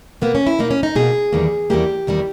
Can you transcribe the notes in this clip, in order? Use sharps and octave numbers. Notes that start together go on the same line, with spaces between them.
B2 A#3 B3
C#4
E4
B2 A#3 D#4
C#4
D#4
B2 A#3 G#4
E2 D#3 G3 A#3
E2 D#3 G3 A#3 G4
E2 D#3 G3 A#3